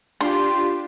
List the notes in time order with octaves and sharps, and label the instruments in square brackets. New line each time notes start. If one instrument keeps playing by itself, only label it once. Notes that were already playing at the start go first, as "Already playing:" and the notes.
[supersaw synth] D4 F4 G4 [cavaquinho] C6